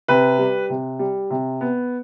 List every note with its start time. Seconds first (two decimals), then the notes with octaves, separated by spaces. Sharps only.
0.08 C3 B4
0.39 G3
0.70 C3
0.99 G3
1.30 C3
1.61 B3